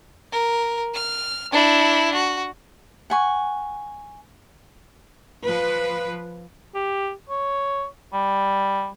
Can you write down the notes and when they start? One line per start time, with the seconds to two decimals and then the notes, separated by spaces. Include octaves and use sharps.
0.32 A#4
0.94 F6
1.52 D4 E4
2.15 F#4
3.10 F#5 G#5 C#6
5.46 F3 B4
6.75 G4
7.30 C#5
8.13 G3